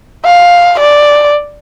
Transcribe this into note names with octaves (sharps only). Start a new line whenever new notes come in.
F5
D5